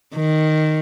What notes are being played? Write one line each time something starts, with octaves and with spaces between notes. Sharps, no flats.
D#3